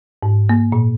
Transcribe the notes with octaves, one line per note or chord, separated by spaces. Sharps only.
G#2
A#3
A#2